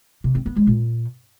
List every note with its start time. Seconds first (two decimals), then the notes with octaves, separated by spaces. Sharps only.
0.24 C3
0.35 C4
0.46 B3
0.56 G#3
0.67 A#2